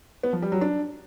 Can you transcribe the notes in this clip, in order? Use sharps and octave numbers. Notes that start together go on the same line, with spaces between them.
B3
F3
G3
F#3
D4